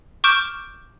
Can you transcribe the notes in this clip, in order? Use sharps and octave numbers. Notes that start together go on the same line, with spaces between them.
C#6 D6 F6 G6 D7 E7